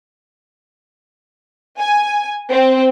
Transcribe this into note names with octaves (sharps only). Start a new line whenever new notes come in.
G#5
C4